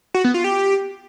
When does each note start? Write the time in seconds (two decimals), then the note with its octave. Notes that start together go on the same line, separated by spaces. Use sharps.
0.14 F#4
0.24 B3
0.34 F4
0.44 G4